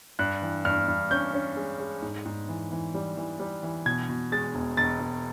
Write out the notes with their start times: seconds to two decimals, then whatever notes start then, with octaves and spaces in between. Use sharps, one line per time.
0.19 G2 F#6
0.42 E3
0.65 G2 F6
0.88 G2
1.11 C#4 G6
1.34 C#4
1.57 G#3
1.80 G#3
2.02 G#2
2.26 G#2
2.49 E3
2.72 E3
2.94 G3
3.17 E3
3.40 G3
3.63 E3
3.86 B2 G#6
4.09 B2
4.32 G#3 A6
4.55 E1
4.77 E1 A6
5.01 E1